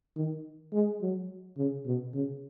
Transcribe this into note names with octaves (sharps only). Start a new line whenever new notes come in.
D#3
G#3
F#3
C#3
B2
C#3